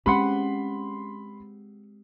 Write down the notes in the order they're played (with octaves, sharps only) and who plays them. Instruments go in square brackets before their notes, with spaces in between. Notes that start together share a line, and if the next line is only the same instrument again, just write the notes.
[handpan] G#3 C4 G4 [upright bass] C#4 [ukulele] B4 F#5 [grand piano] B5 C6